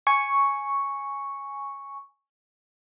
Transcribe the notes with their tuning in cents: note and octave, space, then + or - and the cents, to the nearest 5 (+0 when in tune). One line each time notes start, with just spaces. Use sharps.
G#5 +0 C#6 +0